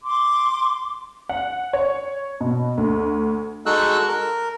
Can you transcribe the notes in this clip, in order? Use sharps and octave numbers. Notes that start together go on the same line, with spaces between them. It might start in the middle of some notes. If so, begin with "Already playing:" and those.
C6 D6
F#5
C#5
B2
D2
G#3 D#4 F#4 A4 E6 F#6
A#4